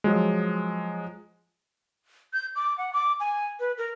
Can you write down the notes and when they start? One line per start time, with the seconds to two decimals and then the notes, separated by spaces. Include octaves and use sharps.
0.04 F3 F#3 G#3
2.33 G6
2.56 D6
2.78 F#5
2.93 D6
3.20 G#5
3.60 B4
3.78 A#4